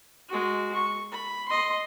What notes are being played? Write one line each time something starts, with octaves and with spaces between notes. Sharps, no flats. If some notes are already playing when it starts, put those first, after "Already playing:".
G#3 F#4
C#6
B5
D#5 C6